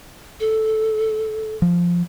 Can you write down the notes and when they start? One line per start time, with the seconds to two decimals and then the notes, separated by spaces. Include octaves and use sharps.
0.40 A4
1.62 F3